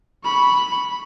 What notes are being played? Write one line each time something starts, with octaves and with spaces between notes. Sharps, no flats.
B5 C#6